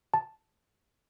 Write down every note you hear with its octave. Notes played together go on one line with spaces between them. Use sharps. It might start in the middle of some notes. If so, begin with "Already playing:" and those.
A5